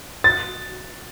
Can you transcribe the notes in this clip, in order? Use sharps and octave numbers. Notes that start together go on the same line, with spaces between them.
A6